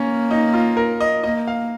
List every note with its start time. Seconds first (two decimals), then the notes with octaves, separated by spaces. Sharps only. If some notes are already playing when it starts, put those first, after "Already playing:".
Already playing: A#3 C#4
0.31 D#4
0.53 F4
0.77 A#4
1.00 D#5
1.24 A#3 D#5
1.47 F5